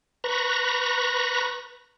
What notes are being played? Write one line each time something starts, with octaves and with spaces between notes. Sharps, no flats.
B4 A#5 B5 C#6 A#6